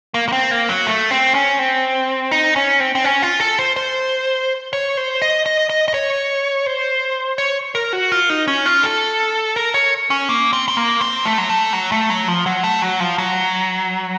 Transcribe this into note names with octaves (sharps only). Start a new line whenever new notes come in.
A#3
A#3
C4
A#3
F#3
A3
C4
C#4
C4
D#4
C#4
C4
C4
C#4
F4
A4
C5
C5
C#5
C5
D#5
D#5
D#5
D#5
C#5
C5
C#5
A#4
F#4
F4
D#4
C#4
F4
A4
A#4
C#5
C#4
A#3
C4
C4
A#3
C4
A3
F#3
A3
F#3
A3
F#3
F3
F#3
A3
F#3
F3
F#3